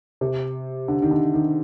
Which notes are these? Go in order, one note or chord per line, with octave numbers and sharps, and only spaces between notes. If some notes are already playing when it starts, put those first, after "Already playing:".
C3
D3
D#3
D3
D#3